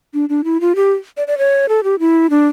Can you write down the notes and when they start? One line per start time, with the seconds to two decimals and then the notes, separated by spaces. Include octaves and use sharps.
0.14 D4
0.29 D4
0.44 E4
0.61 F4
0.76 G4
1.17 D5
1.27 D5
1.38 C#5
1.69 A4
1.84 G4
2.00 E4
2.30 D4